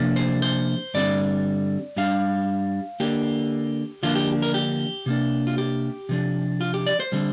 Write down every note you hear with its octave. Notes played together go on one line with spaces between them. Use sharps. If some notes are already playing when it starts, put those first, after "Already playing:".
Already playing: C3 F3 A#3 D4
C5
C5
G2 D3 G3 C4 D5
G2 G3 D4 F5
D3 A#3 D4 G4
D3 F3 A#3 D4 F4
G4
A#4
G4
C3 A#3 D4
F4
G4
C3 F3 D4
F4
G4
D5
C5
D3 G3 C4